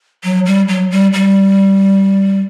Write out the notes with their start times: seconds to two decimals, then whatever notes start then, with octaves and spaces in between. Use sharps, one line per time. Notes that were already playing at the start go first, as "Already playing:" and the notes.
0.24 F#3
0.46 G3
0.68 F#3
0.91 G3
1.13 G3